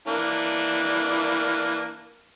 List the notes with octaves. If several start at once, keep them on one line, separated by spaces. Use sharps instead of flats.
E3 A#3 D4